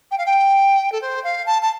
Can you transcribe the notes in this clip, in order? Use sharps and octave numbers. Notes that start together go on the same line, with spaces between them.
G5
F5
G5
A4
C5
F5
A5
A5